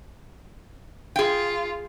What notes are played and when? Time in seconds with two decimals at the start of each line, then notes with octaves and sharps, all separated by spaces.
1.16 F4 G#4 G5